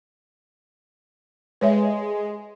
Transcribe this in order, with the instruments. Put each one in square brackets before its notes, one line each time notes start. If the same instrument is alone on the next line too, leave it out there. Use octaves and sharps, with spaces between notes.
[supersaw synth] G#3 [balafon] B4 C#5 E5